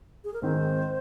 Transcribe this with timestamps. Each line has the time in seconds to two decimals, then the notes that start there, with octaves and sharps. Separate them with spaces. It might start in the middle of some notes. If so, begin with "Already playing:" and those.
0.24 G#4
0.33 A#4
0.42 G#2 D#3 G#3 C4 D#4 C5